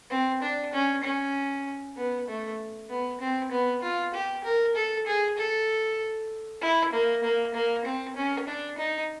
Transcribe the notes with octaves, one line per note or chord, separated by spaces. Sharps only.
C4
D4
C#4
C#4
B3
A3
B3
C4
B3
F4
G4
A#4
A4
G#4
A4
E4
A#3
A#3
A#3
C4
C#4
D4
D#4